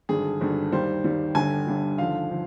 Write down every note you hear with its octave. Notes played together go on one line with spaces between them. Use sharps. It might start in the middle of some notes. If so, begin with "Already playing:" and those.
G#1 G2 D3 G#4
G#1 G2 D3
D#2 D#3 G3 C5
D#2 D#3 G3
G1 G2 D3 G3 G#5
G1 G2 D3 G3
D#2 D3 F3 F5
D3 F3